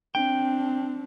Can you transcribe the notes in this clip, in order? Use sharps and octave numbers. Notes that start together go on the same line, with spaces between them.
C4 D4 G5